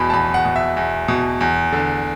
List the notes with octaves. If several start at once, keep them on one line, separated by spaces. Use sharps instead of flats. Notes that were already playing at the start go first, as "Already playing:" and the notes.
Already playing: E2 B2 B5
A5
E2 B5
F#5
B2
E5
E2
B2
E2
D3